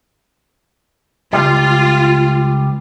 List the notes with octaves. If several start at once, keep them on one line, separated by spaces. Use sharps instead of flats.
C#2 G#2 G3 F4